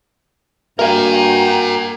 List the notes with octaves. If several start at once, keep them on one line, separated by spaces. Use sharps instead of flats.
G2 A#3 F#4 A#4 G5 G#5 A#5